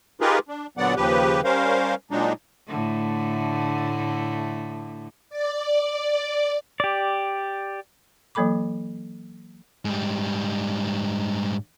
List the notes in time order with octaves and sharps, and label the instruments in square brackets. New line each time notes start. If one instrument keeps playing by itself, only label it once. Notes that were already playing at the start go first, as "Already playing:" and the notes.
[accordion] D#4 F4 G4 G#4 A#4 B4
D4
A#2 D3 F#3 B3 D5 F#5
D#2 C#3 F3 G4 B4
G3 C#4 A#4 C5 F5
A#2 F#3 G#3 D4 D#4
[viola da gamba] A2 D3 A3
[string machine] D5
[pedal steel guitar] G4 D5
[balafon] E3 F#3 A#3 A4 B5 D6
[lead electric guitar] G#2 G3